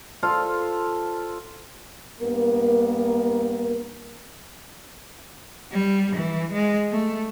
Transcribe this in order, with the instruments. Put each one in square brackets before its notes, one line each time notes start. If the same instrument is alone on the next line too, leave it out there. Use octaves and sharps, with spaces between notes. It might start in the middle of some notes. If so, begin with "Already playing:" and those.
[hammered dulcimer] F4 A4 C5 F5
[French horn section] G2 A#3 B3 A#4
[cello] G3
E3
G#3
A3